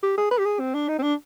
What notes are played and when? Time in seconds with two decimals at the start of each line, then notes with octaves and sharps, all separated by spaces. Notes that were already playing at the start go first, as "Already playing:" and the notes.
0.03 G4
0.17 G#4
0.31 B4
0.38 G4
0.45 G#4
0.60 C4
0.74 D4
0.88 D#4
0.98 C4
1.03 D4